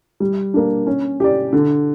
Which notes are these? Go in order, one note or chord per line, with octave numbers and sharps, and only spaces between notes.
G3
A#3 D4
C#4
G4 D5
D3